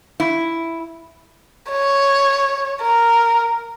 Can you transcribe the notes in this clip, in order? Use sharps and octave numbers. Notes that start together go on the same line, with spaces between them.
E4
C#5
A#4